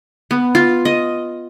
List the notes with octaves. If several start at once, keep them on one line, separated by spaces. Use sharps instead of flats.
B3
F4
D#5